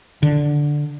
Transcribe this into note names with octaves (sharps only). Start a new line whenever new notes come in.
D3